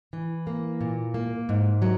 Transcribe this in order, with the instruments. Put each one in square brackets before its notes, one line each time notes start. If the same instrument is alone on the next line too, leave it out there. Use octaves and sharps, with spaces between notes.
[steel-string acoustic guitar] E3
A#3
A#2
A#3
G#2
F#3